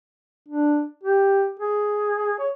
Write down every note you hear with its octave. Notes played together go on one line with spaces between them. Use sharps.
D4
G4
G#4
C#5